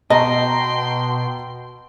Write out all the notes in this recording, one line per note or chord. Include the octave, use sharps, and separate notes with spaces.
B2 D#5 G5 A5 A#5 C6